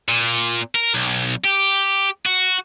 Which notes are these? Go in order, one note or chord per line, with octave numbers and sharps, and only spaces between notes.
A#2
A#4
B1
G4
F#4